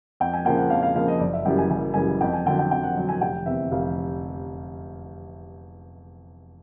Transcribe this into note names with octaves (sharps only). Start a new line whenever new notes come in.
F2 G5
G#5
C#3 F3 A#3 G5
F#5
F2 F5
F5
C#3 F3 A#3 F5
D#5
F#1 D5
E5
F#2 C#3 E3 G3 G5
G#5
F#1 G#5
F#2 C#3 E3 G3 G#5
F2 G5
G#5
D3 F#3 G5
G5
F2 G5
F#5
D3 F#3
G#5
F1 G5
E2 C3 E5
F1 F5